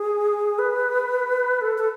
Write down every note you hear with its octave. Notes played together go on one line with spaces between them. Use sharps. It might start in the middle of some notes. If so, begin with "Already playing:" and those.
Already playing: G#4
B4
A4
A4